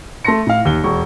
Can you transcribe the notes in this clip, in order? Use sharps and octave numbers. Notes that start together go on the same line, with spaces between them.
A3 A5 C6 A#6 C#7
A2 F5
D#2 G7
E1 C#6